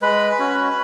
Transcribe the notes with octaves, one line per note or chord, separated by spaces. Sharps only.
G#3 B4 B5
C#4 F#4